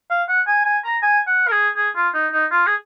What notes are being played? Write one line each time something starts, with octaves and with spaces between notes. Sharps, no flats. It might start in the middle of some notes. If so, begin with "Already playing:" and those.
F5
F#5
G#5
G#5
A#5
G#5
F#5
A#4
G#4
G#4
F4
D#4
D#4
F4
G#4